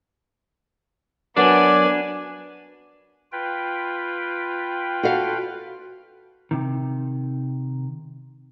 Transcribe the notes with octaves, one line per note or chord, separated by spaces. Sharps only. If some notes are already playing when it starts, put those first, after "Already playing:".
F#3 B3 D4 A#4 B4 D5 G#5
F4 B4 G5
F#4 A4 F5
C3 D#3